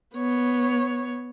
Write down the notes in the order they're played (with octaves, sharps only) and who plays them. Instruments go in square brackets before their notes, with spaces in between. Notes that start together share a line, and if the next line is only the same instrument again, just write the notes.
[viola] B3 C#5